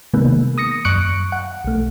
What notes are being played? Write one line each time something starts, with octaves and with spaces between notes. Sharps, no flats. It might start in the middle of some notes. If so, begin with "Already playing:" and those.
C3 D#3 G#3 A#3 B3
D#6 A#6 C#7
F#2 C#6 F#6 C#7 D7
F#5
B1 A3